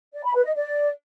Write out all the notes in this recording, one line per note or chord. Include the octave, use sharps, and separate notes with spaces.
D5
B5
B4
D#5
D5